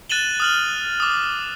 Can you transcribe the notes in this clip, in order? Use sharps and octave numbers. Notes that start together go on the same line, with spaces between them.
F#6 A6 D#7 E7 F#7 G7
D#6 F6 F#7
D6 D#6